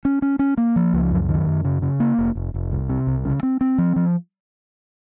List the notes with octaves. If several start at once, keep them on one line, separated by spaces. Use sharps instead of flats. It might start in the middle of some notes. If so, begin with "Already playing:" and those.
C#4
C#4
C#4
A#3
F3
C#2
F#2
D#3
F#2
C#3
C#3
A#3
F1
F1
F1
C2
C3
C2
C#3
C4
C4
F3
F3